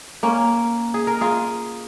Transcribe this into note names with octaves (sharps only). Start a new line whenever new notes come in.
A#3 C#4
G#4
A#4
F4 G#4